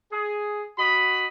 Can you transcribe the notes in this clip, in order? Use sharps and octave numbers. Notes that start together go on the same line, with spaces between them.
G#4
F#4 D#5 B5